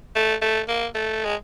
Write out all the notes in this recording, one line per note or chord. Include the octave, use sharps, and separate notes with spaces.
A3
A3
A#3
A3
G#3